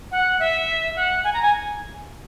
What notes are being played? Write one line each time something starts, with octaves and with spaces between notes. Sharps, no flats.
F#5
E5
F#5
G#5
A#5
G#5